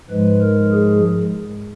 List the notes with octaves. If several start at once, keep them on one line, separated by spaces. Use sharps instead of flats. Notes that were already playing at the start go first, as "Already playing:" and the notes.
G#2 F3 G#3 B4
A#4
G#4